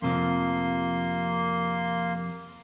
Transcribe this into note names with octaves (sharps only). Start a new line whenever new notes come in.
F2 C3 F3 A#3 C6